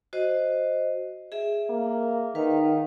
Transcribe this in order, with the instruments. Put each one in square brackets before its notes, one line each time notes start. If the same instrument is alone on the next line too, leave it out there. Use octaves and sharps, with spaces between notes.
[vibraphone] F#4 C5 D#5
G#4 E5
[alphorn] A#3
[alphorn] D#3 [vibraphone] B4 F5